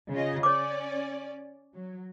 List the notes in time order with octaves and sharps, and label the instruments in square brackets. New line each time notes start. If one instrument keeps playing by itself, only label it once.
[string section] C#3 F4 D#5
[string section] C#4 D5 [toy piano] C#5 D6
[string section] F#3